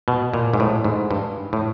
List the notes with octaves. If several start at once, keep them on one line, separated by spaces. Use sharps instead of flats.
B2
A#2
G#2
A2
G#2
G2
A2